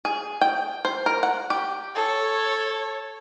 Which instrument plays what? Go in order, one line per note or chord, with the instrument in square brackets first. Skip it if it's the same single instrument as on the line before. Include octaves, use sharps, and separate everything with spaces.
[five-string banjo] G#4
G5
C5
A#4
F#5
G4
[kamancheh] A4 C#5